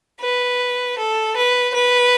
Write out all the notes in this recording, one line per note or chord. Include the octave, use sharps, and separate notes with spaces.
B4
A4
B4
B4